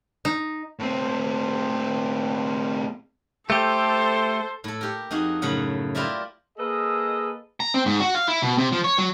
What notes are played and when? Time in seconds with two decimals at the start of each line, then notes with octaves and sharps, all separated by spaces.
0.25 D#4
0.79 A2 C4
3.50 A3 G4 A4 C5
4.64 A2 A4
4.81 G4 A#4
5.11 F2 D#4 F#4 G#4
5.42 F#2 A2 C#3 F#5
5.95 E4 F4 G4 A#4 D5 E5
6.58 A#3 G#4 A4 B4 D#5
7.60 A#5
7.74 C4
7.86 G#2
8.00 F#4
8.15 F5
8.28 E4
8.42 B2
8.58 C3
8.72 F3
8.84 C#5
8.99 F#3